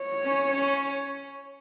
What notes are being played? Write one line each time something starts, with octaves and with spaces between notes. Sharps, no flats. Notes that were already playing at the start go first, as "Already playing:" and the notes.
Already playing: C#5
C#4
C#4